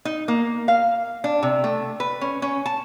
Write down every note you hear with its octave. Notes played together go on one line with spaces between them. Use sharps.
D#4
A#3
F5
D4
C3
A3
B4
C#4
C#4
A5